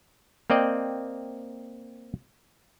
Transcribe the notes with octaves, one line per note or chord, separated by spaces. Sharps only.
A#3 C4 D5 D#5 G5